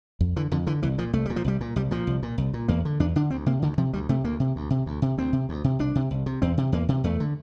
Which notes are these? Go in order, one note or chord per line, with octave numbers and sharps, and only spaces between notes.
F2
D3 E3
F2 D3
D3 E3
C2 E3
A#2 F3
C2 A3
A#2 G3
F3
C2 G3
A#2
C2 G3
A#2 F3
C2
A#2
C2
A#2
E2 A#3
D3
E2 D4
D3 D4
D2 C4
C3 A#3
D2 D3
C3 F3
D2 G3
C3 A3
D2 A#3
C3
D2
C3
D2
C3
D2 C4
C3
D2
C3
C2 D4
C3
C2
C3
E2 C4
C3
E2 A#3
C3
E2 A3
D3